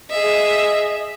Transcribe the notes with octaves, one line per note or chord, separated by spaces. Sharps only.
G#4 D#5 E5